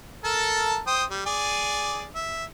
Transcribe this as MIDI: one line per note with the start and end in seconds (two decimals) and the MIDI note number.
0.25 0.79 69
0.25 0.79 70
0.25 0.79 81
0.87 1.03 72
0.87 1.03 79
0.87 1.03 87
1.10 1.22 55
1.26 2.07 68
1.26 2.07 74
1.26 2.07 80
2.15 2.44 76